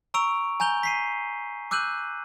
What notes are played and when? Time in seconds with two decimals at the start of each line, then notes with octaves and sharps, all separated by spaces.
0.14 A#5 C#6 E6 D7 F7
0.60 G#5 A#5 G6 F7 G7
0.83 B6 C7 D#7
1.71 D6 E6 F#6 G6 D#7 F#7